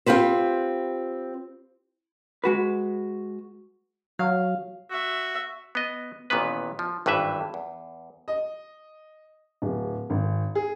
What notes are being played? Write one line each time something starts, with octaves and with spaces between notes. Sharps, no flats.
C4 F4 G4 B4 C5
G#3 F#4 B4
F#3 F5
F#4 E5
B3 D#5
A1 A#2 D#3 B3 B4
F3
G#1 G2 E3 B4 E5
E2
D#5
D1
G#1
G#4